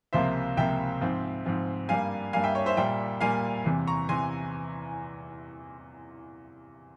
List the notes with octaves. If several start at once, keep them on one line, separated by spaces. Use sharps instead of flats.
C#2 C3 F3 A#3 C5 E5
C#2 C3 F3 A#3 E5 G5
G#2 F3 C4
G#2 F3 C4
G2 G3 A#3 F5 G#5
G2 G3 A#3 F5 G#5
E5 G5
C#5
C5 E5
A#2 G3 A#3 E5 G5
A#2 G3 A#3 F5 G#5
E2 C3 E3
A#5 C#6
E2 C3 E3 G#5 C6